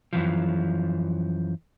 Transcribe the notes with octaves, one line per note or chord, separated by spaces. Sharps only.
F#2 E3 F3